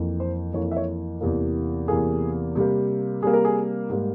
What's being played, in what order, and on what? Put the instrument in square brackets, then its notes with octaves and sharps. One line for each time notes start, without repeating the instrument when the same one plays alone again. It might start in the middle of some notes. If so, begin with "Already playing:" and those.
Already playing: [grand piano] F2 E3 A#3
C5
F2 E3 A#3 C#5
E5
C#5
E2 C3 E3 A#3
E2 C3 E3 A#3 G#4
C3 G3 A#3
C3 G3 A#3 G#4
A#4
G#4
G#2 G3 A#3